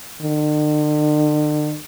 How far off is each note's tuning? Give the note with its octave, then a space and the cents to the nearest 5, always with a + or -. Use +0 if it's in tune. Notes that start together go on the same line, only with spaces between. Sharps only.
D3 +45